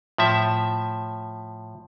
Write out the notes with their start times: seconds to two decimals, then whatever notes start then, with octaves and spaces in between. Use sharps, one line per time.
0.18 A2 F3 E5